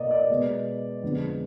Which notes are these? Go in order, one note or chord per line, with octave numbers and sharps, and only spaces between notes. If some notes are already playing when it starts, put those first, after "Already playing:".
Already playing: B2 A#3 D5 D#5
D5
B2 G#3 B3
F2 D3 G#3 B3